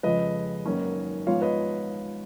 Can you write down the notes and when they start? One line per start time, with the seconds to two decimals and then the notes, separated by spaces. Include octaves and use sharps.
0.03 F2 C#3 F3 G#3 B4 D#5
0.66 G#1 F#2 D#3 A#3 C#4
1.27 G#2 F3 B3 F4 C#5 F5
1.42 B4 D#5